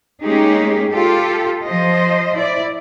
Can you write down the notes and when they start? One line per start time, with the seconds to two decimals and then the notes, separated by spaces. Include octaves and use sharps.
0.23 G#3 A#3 C#4 D#4 G4 G#4
0.91 F4 G4 A4
1.67 F3 C5 D#5
2.35 E4 D5